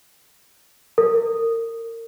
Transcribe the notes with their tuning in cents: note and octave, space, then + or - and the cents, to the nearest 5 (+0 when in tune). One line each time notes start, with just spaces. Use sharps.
A#4 -30